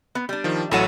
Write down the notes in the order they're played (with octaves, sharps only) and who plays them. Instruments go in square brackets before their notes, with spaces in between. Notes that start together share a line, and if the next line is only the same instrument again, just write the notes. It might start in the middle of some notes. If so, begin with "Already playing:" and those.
[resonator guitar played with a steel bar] B3
G3 D4
[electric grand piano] D#3 F3
[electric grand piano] A1 F#3 D#7 [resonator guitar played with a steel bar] E4 A4 F#5